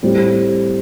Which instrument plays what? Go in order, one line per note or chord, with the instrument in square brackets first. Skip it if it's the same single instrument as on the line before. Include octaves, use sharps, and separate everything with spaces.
[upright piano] A2 G3 C4